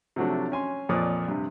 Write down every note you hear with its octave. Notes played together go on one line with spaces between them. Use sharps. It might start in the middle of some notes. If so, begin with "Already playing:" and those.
C3 F3 F#3 A3 D4
C#4 G#5 C6
F2 A#2 F3 C#5 D5 D#6
G2 C3